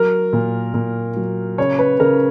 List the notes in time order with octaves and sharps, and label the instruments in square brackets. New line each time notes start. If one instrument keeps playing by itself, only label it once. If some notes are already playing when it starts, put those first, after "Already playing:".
Already playing: [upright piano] F#3 A#4
A#2
A#2
F#3
C#3 C#5
B4
C#3 A#4